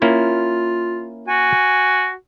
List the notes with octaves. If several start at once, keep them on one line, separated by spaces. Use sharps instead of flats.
A#3 C#4 E4 F4
F#4 G#5